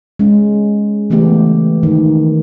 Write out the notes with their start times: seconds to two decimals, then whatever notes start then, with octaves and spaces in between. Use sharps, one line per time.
0.19 G#3 C#4
1.10 C#3 E3 A3 B3 G4
1.83 D#3